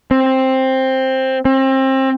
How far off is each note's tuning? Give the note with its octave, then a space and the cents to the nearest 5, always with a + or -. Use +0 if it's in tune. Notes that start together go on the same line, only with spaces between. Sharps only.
C4 +10
C4 +30